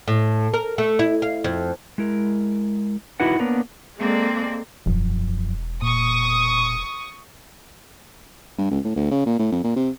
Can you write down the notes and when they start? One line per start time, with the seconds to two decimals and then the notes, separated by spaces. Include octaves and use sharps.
0.08 A2
0.54 A#4
0.78 A3
0.99 E4
1.22 F5
1.44 F2
1.98 G#3 E4 A#4
3.20 D#4 E4 F#4 B4 F#5
3.39 A#3 B3 D4 A#4 B4 C#5
4.00 G#3 A#3 C4 A4 D5
4.86 E1 F#2 F3
5.82 A#2 C#6 D#6
8.58 G2
8.71 C#2
8.84 A2
8.96 D2
9.11 C#3
9.26 A#2
9.39 A2
9.52 F2
9.64 A#2
9.76 C3